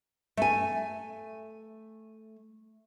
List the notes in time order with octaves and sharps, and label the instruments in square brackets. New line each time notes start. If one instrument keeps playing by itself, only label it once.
[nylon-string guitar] A3 G#5